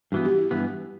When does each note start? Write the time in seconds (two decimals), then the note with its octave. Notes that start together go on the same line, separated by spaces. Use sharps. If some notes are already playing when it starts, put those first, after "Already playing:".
0.12 G2 E3 B3 F#4
0.25 G4
0.38 E4
0.51 G2 E3 B3 E4